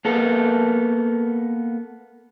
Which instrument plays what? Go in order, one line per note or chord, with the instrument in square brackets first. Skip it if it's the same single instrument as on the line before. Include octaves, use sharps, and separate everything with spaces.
[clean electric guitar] A#3 B3 A4